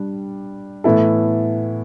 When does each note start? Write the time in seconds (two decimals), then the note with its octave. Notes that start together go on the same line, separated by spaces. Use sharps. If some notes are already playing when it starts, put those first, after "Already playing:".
Already playing: G3 D4 G4
0.84 A2 E3 B3 E4 A4